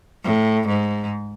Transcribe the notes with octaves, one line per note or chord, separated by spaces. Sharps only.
A2
G#2